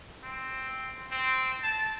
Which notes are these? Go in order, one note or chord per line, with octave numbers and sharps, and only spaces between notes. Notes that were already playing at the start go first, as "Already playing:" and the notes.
C4
C4
A5